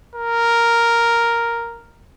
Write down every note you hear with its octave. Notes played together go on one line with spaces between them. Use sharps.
A#4